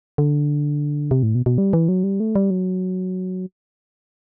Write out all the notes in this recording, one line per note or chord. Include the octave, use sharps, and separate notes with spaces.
D3
C3
A2
B2
B2
G3
E3
F#3
G3
A3
G3
F#3